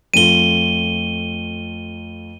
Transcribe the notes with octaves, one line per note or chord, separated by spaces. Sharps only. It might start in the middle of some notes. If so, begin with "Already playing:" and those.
F2 A3 F4 D#7 G7